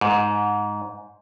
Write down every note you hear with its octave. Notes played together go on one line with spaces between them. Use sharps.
G#2